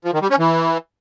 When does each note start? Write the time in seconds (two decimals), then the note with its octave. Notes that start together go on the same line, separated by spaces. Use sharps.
0.05 F3
0.13 D#3
0.22 G3
0.30 C#4
0.39 E3